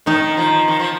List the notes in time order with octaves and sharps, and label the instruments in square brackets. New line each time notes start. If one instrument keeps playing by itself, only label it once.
[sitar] D#3 [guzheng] D#4
[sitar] F3
D#3
F3